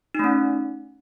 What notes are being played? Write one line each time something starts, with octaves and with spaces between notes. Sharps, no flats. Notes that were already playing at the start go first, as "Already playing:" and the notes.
A3 C#4 D#4